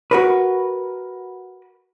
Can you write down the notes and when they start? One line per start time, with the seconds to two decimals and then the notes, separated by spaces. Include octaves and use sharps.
0.11 F#4 A#4 B4